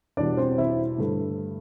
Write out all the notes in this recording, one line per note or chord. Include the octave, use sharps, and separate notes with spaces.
E2 B2 G3 D4 D5
C4 C5
E4 E5
G2 D3 A3